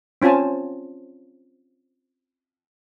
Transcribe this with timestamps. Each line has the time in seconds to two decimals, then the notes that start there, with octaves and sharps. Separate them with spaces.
0.22 C4 C#4 F4 G#5 A5